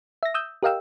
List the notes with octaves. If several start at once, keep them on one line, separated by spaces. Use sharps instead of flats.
E5 A#6
D#6 E6 G6
G4 A#4 D#5 F5 G5 E6